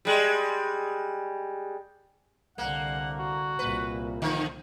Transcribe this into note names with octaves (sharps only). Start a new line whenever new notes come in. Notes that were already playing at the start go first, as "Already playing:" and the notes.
G3 G#3
C2 D3 A#3 F#5
F#4
C2 A#2 B4
F2 D3 D#3